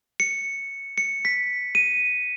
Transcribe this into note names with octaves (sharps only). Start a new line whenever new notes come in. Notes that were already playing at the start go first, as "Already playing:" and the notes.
C#7
C#7
B6
D#7